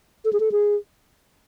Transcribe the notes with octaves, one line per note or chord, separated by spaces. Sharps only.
A4
G#4
A4
G#4